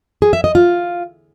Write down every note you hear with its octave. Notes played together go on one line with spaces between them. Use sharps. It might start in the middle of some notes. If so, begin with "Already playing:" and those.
G#4
E5
D#5
F4